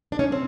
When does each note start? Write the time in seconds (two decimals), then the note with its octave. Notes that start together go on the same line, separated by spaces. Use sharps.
0.12 D4
0.19 C#4 D#4
0.32 C4